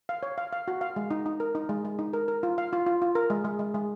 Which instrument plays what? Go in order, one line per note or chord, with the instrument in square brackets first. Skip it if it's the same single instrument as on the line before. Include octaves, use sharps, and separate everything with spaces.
[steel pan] F5
C#5
F5
F5
F#4
F5
G#3
D#4
D#4
A#4
D#4
G#3
G#3
D#4
A#4
A#4
F4
F5
F4
F4
F4
A#4
G#3
G#3
G#3
G#3